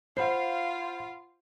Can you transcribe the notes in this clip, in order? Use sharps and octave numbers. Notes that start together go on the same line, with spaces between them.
F4 C5 F5 F#5 B5 C7